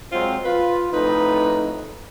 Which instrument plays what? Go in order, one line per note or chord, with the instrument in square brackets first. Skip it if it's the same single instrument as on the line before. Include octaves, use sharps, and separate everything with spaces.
[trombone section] F#3 G#3 C4 [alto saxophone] F4
[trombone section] F4 [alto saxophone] B4
[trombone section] F2 A2 D#4 [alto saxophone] B4